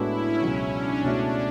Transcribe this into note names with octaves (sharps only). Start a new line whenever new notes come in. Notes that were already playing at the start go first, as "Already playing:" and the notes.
Already playing: A2 G#3 B3 D4 E4 F#4
C#4
C#2 B2 F#3 C#4
D4
C#2 B2 A3 D4 E4